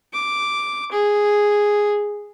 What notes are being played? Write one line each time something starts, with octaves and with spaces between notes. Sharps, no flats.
D6
G#4